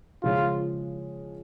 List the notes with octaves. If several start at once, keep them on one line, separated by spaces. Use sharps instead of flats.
C#3 F3 G#3 F4